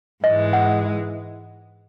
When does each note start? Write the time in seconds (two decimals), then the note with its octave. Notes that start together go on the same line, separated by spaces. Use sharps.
0.24 G#2 E3 G#3 D#5
0.53 F#5